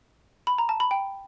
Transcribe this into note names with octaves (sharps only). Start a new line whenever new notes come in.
B5
A#5
A5
B5
G5